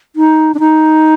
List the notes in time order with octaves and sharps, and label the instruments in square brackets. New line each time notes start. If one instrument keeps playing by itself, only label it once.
[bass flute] D#4
D4
D#4